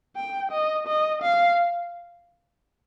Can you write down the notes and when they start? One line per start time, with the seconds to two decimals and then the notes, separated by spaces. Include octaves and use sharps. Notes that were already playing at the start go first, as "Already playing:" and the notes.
0.16 G5
0.51 D#5
0.87 D#5
1.22 F5